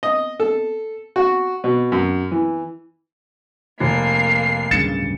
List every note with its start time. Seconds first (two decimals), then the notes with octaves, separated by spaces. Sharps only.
0.03 D#5
0.40 A4
1.16 F#4
1.64 B2
1.92 F#2
2.31 E3
3.80 F1 A#3 C7
4.71 D1 G2 C#3 A6 C#7 E7